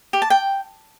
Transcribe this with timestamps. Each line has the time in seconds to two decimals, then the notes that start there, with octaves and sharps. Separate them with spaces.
0.13 G4
0.22 A5
0.30 G5